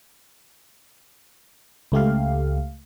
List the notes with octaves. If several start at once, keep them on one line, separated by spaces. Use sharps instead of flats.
C#2 A3 G4 F5